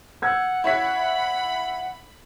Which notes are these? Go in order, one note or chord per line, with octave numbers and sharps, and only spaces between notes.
F#5 E6 G6 G#6
E4 C#5 B5 B6